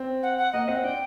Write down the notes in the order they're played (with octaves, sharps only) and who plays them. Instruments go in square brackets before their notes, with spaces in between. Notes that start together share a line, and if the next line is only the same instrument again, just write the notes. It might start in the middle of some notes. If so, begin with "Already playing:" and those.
Already playing: [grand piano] C4
[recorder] F#5
F#5
[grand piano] A#3 [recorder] D#5
[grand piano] C4 [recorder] F#5
[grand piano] D4 [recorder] G5